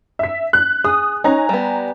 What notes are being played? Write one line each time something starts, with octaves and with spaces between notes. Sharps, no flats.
E5 B6
F#6
G#4 D#6
C#4 D#4 G#5 A#5
G3 B3